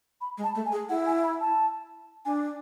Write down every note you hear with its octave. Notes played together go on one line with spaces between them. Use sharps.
B5
G#3
A5
A3
G#5
G#4
E4 F#5
G#5
B5
A5
D4 G#5